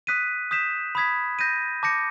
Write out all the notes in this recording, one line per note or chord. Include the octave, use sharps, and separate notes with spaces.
D#6 F#6 B6 D#7
D#6 G6 B6 E7
B5 D#6 G#6 B6
G6 A#6 D#7
A5 D6 G6 A#6 C#7